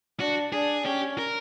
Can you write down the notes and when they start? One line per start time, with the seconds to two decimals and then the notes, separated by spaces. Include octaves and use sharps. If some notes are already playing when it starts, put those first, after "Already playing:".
0.20 D4 F#4
0.53 D4 G#4
0.86 C#4 G4
1.18 A#4